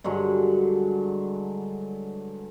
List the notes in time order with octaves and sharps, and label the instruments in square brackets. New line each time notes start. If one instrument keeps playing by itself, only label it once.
[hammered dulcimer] G2 D3 F#3 G#3